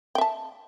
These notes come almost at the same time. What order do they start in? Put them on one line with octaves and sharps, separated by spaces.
G5 E5 A5